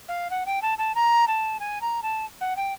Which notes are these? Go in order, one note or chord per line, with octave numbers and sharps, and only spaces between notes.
F5
F#5
G5
A5
A5
A#5
A5
G#5
A#5
A5
F#5
G5